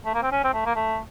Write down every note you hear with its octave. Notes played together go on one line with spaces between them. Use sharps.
A3
A#3
C4
C#4
C4
A3
A#3
A3